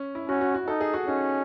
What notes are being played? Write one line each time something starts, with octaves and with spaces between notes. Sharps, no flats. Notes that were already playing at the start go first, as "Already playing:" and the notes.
Already playing: C#4
E4
C#4 F#4
F#4
F#4
D#4 A4
G#4
F#4
C#4 D#4